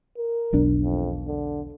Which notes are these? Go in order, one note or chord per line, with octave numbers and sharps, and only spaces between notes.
A#4
E1 B1 D4
F2
D3